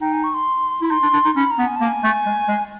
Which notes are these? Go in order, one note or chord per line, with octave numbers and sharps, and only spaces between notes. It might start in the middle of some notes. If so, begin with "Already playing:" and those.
D#4 G5
G#5
C#6
C6
E4
D#4 C6
D4
D4
D#4
C#4 B5
A#5
B3
G#5
A#3 A5
G#5
A3
G#3
G#3